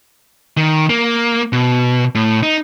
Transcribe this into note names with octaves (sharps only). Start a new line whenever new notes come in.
D#3
A#3
B2
A2
D#4